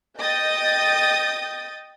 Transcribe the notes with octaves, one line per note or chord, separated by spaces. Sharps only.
D#5 G5 D#6 G6 A6